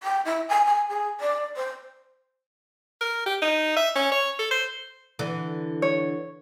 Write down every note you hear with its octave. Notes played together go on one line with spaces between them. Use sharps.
G5
E4
G#5
G#5
G#4
D5
C5
A#4
G4
D#4
E5
C#4
C#5
A4
C5
D3 E3
C#5